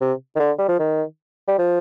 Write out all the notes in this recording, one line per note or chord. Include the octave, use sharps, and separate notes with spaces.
C3
D#3
D3
G3
F3
D#3
G3
F3